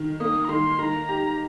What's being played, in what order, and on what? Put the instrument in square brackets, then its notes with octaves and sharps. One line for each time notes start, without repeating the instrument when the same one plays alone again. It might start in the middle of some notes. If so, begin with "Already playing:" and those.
Already playing: [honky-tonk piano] D#3
[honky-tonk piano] A#3 [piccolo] D#6
[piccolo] A#5
[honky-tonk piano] D#3 [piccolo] C6
[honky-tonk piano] D#3 [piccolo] A#5
[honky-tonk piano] G4